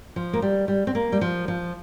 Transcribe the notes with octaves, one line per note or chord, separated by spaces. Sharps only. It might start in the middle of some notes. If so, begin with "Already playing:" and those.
F3
A#3
G3
G3
C4
A#3
G3
F3
F3